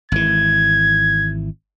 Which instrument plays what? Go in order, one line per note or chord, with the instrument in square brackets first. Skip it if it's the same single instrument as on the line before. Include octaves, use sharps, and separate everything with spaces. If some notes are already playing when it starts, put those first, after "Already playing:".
[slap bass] G#1 E3 [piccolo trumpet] G#6